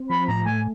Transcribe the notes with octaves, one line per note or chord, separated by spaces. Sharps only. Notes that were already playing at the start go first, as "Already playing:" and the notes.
Already playing: C4
F3 B5
A2 A#5
A3 G#5